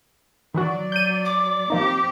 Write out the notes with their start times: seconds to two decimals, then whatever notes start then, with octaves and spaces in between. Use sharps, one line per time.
0.54 D#3 E3 F#3 F#4 D5
0.92 G6 D#7
1.25 D6
1.70 F3 A#3 C4 D#4 G4